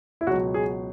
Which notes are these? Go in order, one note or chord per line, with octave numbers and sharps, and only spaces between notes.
E4
C#2 B2 F#3 F#4
G#4